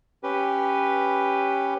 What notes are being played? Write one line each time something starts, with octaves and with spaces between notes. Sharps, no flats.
C#4 G4 B4